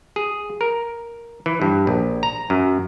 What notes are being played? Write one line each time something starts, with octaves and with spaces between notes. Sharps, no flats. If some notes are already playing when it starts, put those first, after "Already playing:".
G#4
A#4
E3
G2
A#1
A#5
F#2